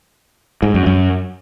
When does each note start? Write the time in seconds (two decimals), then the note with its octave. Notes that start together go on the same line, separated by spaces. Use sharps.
0.63 G#2
0.74 F#2
0.86 F#2